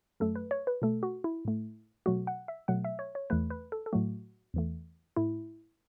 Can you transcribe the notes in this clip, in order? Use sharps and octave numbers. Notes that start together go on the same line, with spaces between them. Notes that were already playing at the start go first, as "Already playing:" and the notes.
F#2 F#3 A3 A4
B4
C#5
B4
B2 A3 A4
F#4
E4
A2 A3
B2 F#3 A3 F#4
F#5
E5
B2 F#3 A3 F#5
E5
C#5
C#5
E2 E3 A3 B4
B4
A4
A4
A2 F#3 A3 F#4
E2 E3 A3
A2 A3 E4